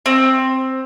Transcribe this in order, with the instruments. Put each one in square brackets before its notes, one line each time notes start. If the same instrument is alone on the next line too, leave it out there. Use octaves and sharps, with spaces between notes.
[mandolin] C4